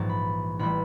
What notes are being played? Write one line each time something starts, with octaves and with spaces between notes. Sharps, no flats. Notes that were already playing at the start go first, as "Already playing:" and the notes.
Already playing: A#1 G#2 E3 G3 A5
B5
A1 E3 G3 B5